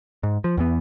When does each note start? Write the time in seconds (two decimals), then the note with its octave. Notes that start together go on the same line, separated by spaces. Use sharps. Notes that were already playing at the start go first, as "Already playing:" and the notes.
0.23 G#2
0.44 F3
0.57 E2 E3 B3